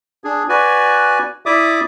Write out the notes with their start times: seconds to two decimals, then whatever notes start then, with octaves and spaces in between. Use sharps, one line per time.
0.24 D4 G#4
0.49 F#4 B4 D5 G#5
1.46 E4 D5 E5 D6 D#6